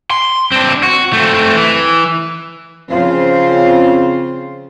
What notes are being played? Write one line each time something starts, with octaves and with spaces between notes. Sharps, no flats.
C6
C4 D4
F#4
A3 C4
E3
C#3 F3 C4 F4 C5